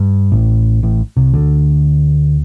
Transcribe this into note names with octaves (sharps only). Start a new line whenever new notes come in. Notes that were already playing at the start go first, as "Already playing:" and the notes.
Already playing: G2
A1 A2
A1 A2
C2 C3
D2 D3